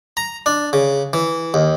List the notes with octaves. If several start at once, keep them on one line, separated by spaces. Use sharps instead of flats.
A#5
D4
C#3
E3
D#2